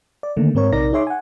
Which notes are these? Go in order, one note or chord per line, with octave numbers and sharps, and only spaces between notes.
D5
D3 D#3 A3 A#3
G#2 C4 A#4 C#5
A#1 C3 D#4 A#4 D5 A#6
D#4 G#4 C#5 E5 C6 D6
F#5 G#5